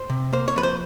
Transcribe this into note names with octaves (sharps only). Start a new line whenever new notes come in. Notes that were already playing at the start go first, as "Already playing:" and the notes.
Already playing: C5
C3
A#3 C5
C#5
F3 B4
C5